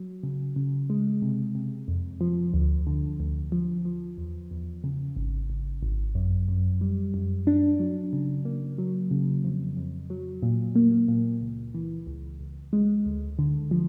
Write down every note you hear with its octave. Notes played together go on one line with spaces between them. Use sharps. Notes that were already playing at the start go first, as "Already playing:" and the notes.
Already playing: F#3
C#3
C#3
G#3
C3
C3
F2
F3
D2
D3
D2
F3
F3
E2
E2
C#3
G#1
G#1
G#1
F#2
F#2
G3
F#2
D4
F#3
C#3
A#3
F#3
C#3
F2
F2
F#3
A#2
A#3
A#2
C#2
E3
C#2
C#2
G#3
D2
D3
F3